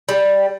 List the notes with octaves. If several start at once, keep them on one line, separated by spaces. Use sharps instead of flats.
G3